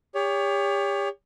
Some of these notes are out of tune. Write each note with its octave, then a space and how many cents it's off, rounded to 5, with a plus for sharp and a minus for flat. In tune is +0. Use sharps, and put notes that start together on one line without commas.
G4 +40 C#5 +30